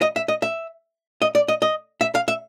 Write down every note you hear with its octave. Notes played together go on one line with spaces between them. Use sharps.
D#5
E5
D#5
E5
D#5
D5
D#5
D#5
E5
F5
E5